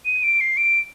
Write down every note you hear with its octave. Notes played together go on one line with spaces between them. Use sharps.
D#7
D7
C7
D7